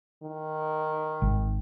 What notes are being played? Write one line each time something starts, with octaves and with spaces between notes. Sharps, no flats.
D#3
G#1